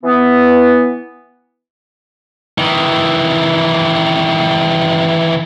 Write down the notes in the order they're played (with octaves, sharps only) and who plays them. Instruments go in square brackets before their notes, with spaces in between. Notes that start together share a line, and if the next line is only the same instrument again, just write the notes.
[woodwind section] E3 B3
[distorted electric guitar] D#3 E3